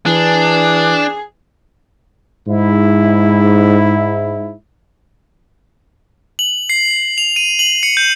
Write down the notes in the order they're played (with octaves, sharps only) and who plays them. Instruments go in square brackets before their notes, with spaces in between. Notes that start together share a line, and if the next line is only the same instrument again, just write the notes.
[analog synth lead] E3 [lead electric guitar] D4 [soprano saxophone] G#4
[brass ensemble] G#2 E4
[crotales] F#7
C7
F7
D#7
F#7
C#7
G6